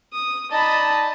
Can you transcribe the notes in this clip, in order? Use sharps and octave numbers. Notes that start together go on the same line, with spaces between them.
D#6
D#4 D5 D#5 A5 B5